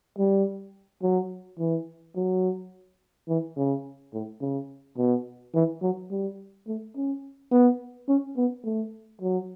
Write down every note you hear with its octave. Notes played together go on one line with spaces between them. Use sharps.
G3
F#3
E3
F#3
E3
C#3
A2
C#3
B2
E3
F#3
G3
A3
C#4
B3
C#4
B3
A3
F#3